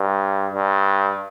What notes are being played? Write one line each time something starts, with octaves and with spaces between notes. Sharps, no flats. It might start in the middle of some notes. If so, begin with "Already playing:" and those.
Already playing: G2
G2